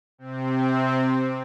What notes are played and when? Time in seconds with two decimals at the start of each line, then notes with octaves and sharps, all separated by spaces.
0.18 C3 C4